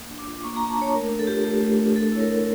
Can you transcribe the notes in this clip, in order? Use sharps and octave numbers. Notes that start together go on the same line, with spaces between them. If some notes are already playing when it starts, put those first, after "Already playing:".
Already playing: A#3
D4
D6
F4
A#3 C#6
A#5
A#3
A5
D4 C#5
A3 A#4
D4
A4
F4 G4
A3 G4
A3
D4
A3 A4
E4 C#5
A#4
A3